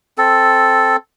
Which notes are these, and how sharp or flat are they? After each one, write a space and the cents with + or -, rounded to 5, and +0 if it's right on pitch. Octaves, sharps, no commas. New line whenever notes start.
C4 +5 A4 +0